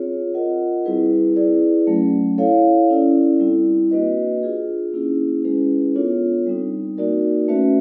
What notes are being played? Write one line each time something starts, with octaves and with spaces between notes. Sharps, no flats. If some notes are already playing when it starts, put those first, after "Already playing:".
Already playing: C4 F4 G#4 C#5
F4 A#4 D#5 F#5
G3 C4 E4 G#4 B4
E4 G#4 B4 D5
F#3 A3 C#4
E4 A4 C#5 F5
C#4 E4 A4 D5
G3 C4 E4
A#3 D4 F#4 B4 D#5
D4 F4 G#4
A#3 C#4 E4 G#4
G#3 C#4 E4 G#4 B4
B3 D4 F4 A4 C#5
G3 C4 D#4
A#3 D#4 F#4 A#4 D5
A3 C#4 F#4 B4 E5